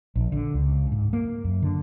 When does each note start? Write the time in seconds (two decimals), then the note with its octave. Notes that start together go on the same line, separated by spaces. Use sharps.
0.16 A#1
0.32 D3
0.54 C#2
0.92 G#2
1.13 A#3
1.44 F#2
1.62 D3